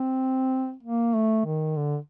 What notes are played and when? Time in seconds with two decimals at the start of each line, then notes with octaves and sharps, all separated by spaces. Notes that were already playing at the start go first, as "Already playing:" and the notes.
Already playing: C4
0.83 A#3
1.14 A3
1.45 D#3
1.76 D3